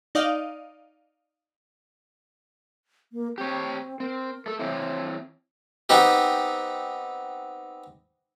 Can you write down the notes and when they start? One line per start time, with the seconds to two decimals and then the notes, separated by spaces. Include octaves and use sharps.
0.15 D#4 D5 D#5 F5
3.13 A#3
3.38 C4 G4 C#5
4.00 C4 A#4
4.46 A3 A4
4.59 E3 C4 E4 C#5
5.89 B3 C4 D#4 G4